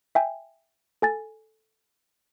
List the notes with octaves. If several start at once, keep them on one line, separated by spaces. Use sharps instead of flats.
E5 G5 G#5
A4 G#5 A6